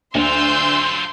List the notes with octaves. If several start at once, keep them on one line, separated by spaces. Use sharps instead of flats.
D2 F#3 F4 C6 E6 G6